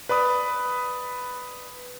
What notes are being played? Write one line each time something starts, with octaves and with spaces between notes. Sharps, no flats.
B4 D5 B5 D#6